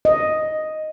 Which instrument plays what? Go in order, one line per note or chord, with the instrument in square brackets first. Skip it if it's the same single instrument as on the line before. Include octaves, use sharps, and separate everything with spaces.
[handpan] D#5